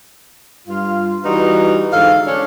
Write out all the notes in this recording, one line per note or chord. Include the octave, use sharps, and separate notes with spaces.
G2 F4
E3 G3 D#4 F#4 B4
G#2 D3 E3 A4 F5
C#4 D4